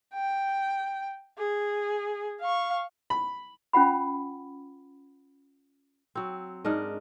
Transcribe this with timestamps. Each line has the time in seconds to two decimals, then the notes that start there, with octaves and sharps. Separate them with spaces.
0.15 G5
1.38 G#4
2.41 F5 C#6
3.10 B5
3.73 C#4 F4 F#5 B5
6.15 F#3 C4
6.65 G#2 D4 A#4 D#5